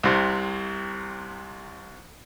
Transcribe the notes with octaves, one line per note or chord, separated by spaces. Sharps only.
C2 C3